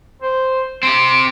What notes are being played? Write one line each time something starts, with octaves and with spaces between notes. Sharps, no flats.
C5
C4 G4 C6